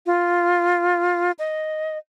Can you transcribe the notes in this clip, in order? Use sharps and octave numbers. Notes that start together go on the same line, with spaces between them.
F4
D#5